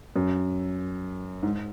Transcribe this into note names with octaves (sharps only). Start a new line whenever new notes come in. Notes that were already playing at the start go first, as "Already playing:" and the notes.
F#2
G#2